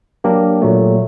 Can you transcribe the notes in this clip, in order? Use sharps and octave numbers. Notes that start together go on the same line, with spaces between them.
F#3 A#3 D4 G4 A#4
A#2 F#3 A3